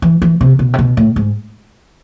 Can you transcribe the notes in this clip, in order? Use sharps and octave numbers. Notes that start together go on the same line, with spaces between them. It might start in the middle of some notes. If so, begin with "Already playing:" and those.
E3
E3
C3
B2
C3
B2
A2
G#2